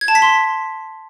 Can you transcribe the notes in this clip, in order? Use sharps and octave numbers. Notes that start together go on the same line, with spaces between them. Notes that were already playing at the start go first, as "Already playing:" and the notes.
G#6
A5
B6
C6